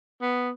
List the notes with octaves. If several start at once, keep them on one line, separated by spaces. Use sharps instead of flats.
B3